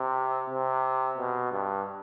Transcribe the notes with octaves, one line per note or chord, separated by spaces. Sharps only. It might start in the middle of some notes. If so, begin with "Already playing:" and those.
Already playing: C3
C3
B2
G2